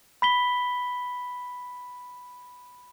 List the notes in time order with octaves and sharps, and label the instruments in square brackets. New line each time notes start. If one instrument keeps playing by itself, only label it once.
[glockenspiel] B5 B6 G7